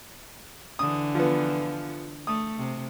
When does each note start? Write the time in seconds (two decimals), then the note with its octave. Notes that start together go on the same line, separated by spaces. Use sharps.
0.79 D3 E3 D#6
1.15 F3 B3
2.27 A3 D#6
2.58 C3